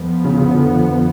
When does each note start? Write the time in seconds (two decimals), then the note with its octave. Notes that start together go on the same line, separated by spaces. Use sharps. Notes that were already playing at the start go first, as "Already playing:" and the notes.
Already playing: F2 F3 B3
0.25 C#3
0.39 C#3
0.52 D3